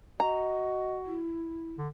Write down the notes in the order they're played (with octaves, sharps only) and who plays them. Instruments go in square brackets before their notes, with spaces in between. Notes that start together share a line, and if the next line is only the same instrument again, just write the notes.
[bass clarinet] F#4 [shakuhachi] D#5 [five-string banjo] A#5
[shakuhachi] E4
[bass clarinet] D3